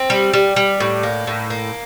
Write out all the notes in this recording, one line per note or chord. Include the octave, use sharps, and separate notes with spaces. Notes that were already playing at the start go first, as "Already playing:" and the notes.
Already playing: C4
G3
G3
G3
A2
A#3
A2
A#3